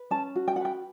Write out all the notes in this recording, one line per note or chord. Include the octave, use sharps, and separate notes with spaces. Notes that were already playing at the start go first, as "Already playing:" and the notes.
Already playing: B4
C#4 A5
F#4
G5
F#5
B4 G5